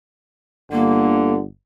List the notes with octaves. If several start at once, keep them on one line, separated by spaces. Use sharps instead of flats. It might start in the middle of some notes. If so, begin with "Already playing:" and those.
G1 D3 A#3